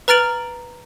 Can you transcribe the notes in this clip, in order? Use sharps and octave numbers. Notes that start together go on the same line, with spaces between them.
B4 A#5 F6 A6 D7 F#7